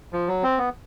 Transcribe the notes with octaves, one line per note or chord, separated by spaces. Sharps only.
F3
F#3
C4
B3